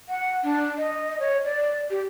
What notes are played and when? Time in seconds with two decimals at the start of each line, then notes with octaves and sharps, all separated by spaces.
0.09 F#5
0.44 D4
0.78 D#5
1.20 C#5
1.45 D5
1.91 G4